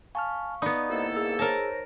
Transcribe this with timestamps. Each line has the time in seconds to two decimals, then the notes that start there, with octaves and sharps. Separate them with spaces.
0.15 F5 G#5 A5 C#6 F6
0.62 B3 D#4 D5 B5 D#6
0.90 C2 A#3 E4 A4 D#5
1.17 G#4 E6
1.39 A#4 C5 C#5 A5 A#6